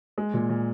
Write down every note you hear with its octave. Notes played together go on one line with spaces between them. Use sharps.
G#3
A#2
A#2